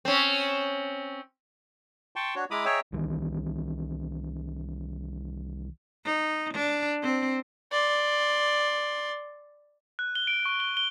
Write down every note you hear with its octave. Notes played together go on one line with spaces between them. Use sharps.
C4 C#4
G5 A5 C6 C#6
D4 F#4 C#5
G#3 E4 A#5 B5 D6 D#6
G#4 C#5 D#5 E5 G5 A#5
C2 D#3 E3
D#4
D4
C4
D5 C6
F#6
G7
D7
C#6
G7
G7